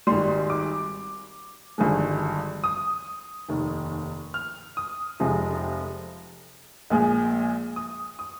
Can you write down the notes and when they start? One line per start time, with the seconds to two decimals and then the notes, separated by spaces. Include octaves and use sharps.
0.07 G#1 G#2 G3 C6
0.50 D6
1.78 G#1 G2 D3 F3 G#3
2.64 D#6
3.48 F1 D#2 D#3
4.34 F6
4.77 D#6
5.20 F1 F2 C3 F3 G#3
6.90 A#1 A#2 G#3
7.76 D#6
8.19 D#6